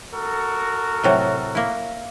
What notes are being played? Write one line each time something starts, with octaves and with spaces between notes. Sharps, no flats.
F#4 A4 A#4
A2 C3 F#3
A#3 E4